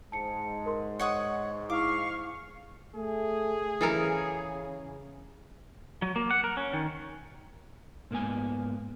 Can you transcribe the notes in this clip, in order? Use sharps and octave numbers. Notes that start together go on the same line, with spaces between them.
G#2 A5 C#7
A#4 C6
C#5 D#5 F#5 D#6
E4 F5 C#6 D6
A3 G#4
C#3 E3 A4 A#4
F#3
A#3
F#5
A#4
C#4
D#3
G#2 A#3 B3 G#5